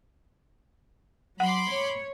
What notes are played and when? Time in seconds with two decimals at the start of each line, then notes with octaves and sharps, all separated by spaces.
1.40 F#3 F#5 B5 C6 D6
1.72 C#5